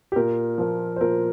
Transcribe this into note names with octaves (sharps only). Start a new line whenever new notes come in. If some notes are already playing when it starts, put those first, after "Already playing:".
G4
A#2 A#4
F3 A#3
C5
A#2 A#4